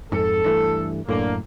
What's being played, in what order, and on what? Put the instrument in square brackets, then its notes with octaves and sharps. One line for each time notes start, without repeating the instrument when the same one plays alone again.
[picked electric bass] F2 G#2 [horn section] A4
[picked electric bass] G2 E3 A3
[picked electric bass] F#2 A2 [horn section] D3 A#3